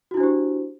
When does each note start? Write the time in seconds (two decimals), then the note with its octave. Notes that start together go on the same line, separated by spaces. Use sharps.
0.11 F#4
0.14 E4
0.17 D4
0.20 C5
0.23 G4